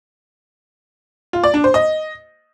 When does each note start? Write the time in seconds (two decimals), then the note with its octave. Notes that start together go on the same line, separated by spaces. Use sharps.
1.33 F4
1.44 D5
1.54 D4
1.64 C5
1.74 D#5